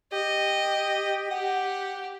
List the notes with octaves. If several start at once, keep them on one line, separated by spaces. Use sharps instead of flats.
G4 D#5
G4 F#5